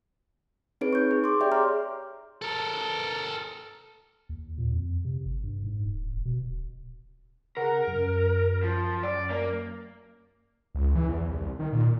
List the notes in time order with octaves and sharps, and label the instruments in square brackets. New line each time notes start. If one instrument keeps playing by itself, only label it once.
[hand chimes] C4 D#4 G#4 B4 C#5 D7
C#6 G6
G#4
C6 D6
G4 G#4 D5 E5 G5 G6
C#5 A#5 C6 D6 F6
[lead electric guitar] A4 A#4
[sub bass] D#2
A#2
F2
C3
G#1
G2
G#2
D1
E1
B2
D1
[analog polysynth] C#3 F#5 A#5 [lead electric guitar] A#4
[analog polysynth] F#2
[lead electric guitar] F3
D5
A#3
[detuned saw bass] C#2
E3
E2
C2
D#3
A#2